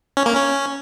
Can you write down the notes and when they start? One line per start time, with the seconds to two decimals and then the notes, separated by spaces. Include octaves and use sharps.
0.17 C#4
0.26 A#3
0.35 C#4